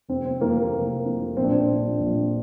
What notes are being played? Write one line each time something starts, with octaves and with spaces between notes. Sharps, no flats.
F1 C4
C4
F2 E3 A#3
A#3
F1
F2 E3
A#1 C4
D4
C4
A#2 F3
A#1